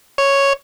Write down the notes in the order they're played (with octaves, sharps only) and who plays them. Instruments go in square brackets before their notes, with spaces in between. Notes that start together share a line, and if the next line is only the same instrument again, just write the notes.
[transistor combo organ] C#5